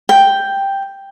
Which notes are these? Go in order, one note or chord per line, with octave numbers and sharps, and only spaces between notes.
G5